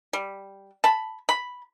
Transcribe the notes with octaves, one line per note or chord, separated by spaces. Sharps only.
G3
A5 B5
B5